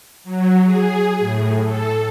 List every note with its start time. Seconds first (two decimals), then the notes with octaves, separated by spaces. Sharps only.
0.24 F#3
0.64 G#4
1.19 A2
1.63 A4